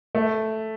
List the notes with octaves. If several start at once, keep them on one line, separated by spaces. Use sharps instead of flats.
A3